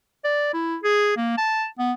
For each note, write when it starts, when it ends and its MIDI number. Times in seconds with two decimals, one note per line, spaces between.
0.25 0.52 74
0.53 0.76 64
0.83 1.16 68
1.17 1.33 58
1.38 1.66 81
1.79 1.93 59